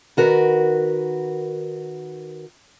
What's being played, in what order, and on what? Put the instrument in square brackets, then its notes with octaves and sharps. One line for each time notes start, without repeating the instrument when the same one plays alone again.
[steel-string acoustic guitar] D#3 F#4 A#4 B4